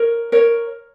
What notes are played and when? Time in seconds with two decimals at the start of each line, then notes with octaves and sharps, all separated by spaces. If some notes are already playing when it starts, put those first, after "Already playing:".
Already playing: A#4 C#5
0.32 A#4 C#5